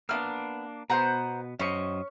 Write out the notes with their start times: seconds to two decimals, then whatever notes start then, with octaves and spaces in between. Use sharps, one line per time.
0.09 A#3 B3 D4 E4 F6
0.90 B2 B3 C5 F#5 A#5
1.60 F#2 C#4 C5 D#5 C#6